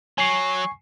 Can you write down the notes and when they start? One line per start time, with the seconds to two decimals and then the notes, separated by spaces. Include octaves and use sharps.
0.18 F#3 G#5 C#6 C7